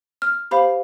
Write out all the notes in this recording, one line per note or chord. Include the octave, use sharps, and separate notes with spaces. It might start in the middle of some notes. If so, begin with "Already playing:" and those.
F6
G4 C5 F5 B5